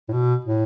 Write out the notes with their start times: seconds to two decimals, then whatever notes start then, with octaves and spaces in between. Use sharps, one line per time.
0.09 A2
0.13 B2
0.45 A2